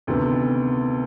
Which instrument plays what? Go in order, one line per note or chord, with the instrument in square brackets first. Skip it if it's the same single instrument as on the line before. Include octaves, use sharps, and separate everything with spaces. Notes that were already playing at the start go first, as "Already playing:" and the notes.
[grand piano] D2 C3 D#3 B3